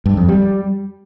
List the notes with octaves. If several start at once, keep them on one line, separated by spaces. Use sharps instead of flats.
G2
F2
G3